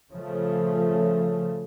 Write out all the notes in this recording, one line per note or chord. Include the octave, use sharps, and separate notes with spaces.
C#3 F3 A3